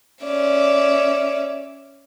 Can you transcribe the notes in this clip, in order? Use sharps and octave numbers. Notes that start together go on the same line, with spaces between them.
C#4 D5 E5